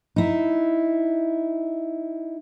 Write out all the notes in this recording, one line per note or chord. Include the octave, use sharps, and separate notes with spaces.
D#4 E4